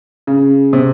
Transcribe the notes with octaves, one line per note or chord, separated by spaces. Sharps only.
C#3
C3